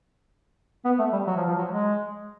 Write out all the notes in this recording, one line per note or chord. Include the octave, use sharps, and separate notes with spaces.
B3
A3
G3
F#3
F3
F3
F#3
G#3